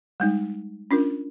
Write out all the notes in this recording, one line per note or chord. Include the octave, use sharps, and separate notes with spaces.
G3 G#3 D#4
C#4 D4 F4 A#4